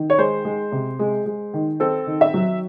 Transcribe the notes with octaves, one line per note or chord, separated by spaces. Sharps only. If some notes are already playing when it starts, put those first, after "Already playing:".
Already playing: D#3
C#5
G#3 C5
G#3
C3
G#3
G#3
D#3
C4 A4
D#3
E5
F#3